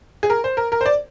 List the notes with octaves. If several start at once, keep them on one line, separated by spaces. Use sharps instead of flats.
G#4
A#4
C5
A#4
A#4
C5
D5